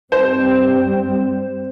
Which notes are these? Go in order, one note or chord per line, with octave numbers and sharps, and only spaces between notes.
G2 G3 C4 C5